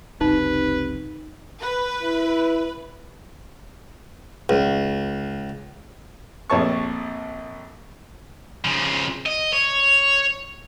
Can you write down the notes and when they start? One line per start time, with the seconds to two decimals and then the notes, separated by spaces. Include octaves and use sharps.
0.21 F#1 C#2 F#2 C3 D#4 B4
1.61 B4
2.03 E4
4.49 C#2
6.50 A#1 F2 C#5 A5 C#6
8.65 C#3 F3
9.26 D#5
9.53 C#5